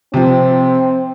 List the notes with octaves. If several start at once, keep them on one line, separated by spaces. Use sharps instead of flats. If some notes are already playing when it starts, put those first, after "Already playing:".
C3 F3 C4